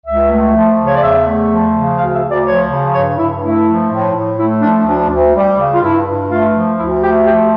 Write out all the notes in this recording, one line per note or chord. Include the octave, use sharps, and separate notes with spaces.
C#2 E5
A3
F3
C#3
C#5
D5
E2 E5
A3
F3
C#3
D2 F5
E5
D2
D5
F3 C#5
C#3
G2 C#5
G2 E4
A3 E4
F3
A2
A2
A3 E4
F3 D4
D2 D4
D2
G3
C#3
F4
G2 E4
G2
A3 F4
F3
D2 E4
A3 G4
F3 G4